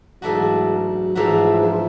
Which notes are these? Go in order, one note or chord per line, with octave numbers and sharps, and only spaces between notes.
G#2 E3 F#3 A3 D4 F#4
G#2 E3 F3 A3 D4 F#4
F3